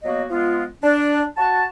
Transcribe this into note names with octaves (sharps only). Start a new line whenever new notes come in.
F#3 A#3 B3 F#4 D#5
F3 G#3 B3 F4
D4
F#4 A5